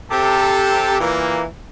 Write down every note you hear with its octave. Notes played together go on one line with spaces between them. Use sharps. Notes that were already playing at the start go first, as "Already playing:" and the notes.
C3 G4 A4
A#2 E3 A#3